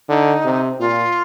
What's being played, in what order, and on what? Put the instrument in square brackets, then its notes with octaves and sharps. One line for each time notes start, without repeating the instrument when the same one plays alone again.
[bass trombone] D3 [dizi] D#4
[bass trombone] C3
[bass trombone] A#2 [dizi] F4